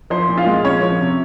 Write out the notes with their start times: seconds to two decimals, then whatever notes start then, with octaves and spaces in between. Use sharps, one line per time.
0.10 F3 C5
0.29 A#2
0.37 F4 F5
0.46 G#3
0.65 F3 C#4 C#5
0.83 F3
1.00 C3